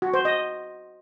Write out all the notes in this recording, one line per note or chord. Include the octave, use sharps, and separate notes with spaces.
F#4
C5
D#5